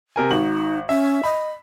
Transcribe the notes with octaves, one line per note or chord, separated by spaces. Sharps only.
C3 A#4 G#5
G#1 D#4 F#4 F#7
C#4 E5
D#5 B5